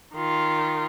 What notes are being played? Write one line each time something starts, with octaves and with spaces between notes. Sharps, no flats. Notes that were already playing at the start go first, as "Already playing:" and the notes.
D#3 F4